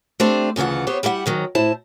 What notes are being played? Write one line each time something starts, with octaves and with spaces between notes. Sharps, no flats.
A3 C4 D4 G4 C5
D2 C#3 E3 F4 F#5
B3 G4 C5 C#5
G3 E4 G4 F5 F#5
G#2 D#3 F#3
A2 E4 C5 A5